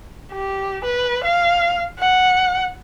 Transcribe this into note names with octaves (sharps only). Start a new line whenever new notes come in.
G4
B4
F5
F#5